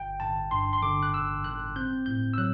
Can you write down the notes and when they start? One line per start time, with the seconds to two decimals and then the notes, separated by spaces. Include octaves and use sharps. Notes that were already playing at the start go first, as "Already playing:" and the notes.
Already playing: G1 G5
0.20 G1 A5
0.51 G2 C6
0.73 C6
0.82 D3 D6
1.03 F#6
1.14 G1 E6
1.44 G1 F#6
1.76 C4 G6
2.06 A2 G6
2.34 E6
2.38 F#3 F#6